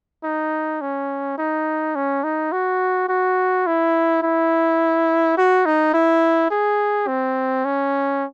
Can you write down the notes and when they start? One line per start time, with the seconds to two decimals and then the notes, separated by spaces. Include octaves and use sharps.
0.24 D#4
0.81 C#4
1.38 D#4
1.95 C#4
2.24 D#4
2.52 F#4
3.09 F#4
3.67 E4
4.23 E4
5.38 F#4
5.65 D#4
5.94 E4
6.51 G#4
7.07 C4
7.65 C#4